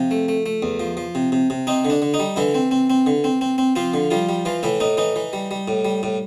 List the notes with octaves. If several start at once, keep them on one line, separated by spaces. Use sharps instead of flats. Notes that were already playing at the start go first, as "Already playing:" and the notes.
Already playing: C3 F3 F4
A3
A3
A3
E2
F3
F3
C3
C3
C3
C4 D#4
D3
D4
D3
D#4
G3
D3 E3 E4
C4
C4
C4
D3
C4
C4
C4
F3 C4 F4
D3
F3 G3 F4
G3
E3 F3 F4
A2 E3 E4
A2 D#4
E3 D#4
E3
G3
G3
A2
G3
A2